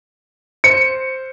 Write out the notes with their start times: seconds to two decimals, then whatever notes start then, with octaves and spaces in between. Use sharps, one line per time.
0.64 C5 C#7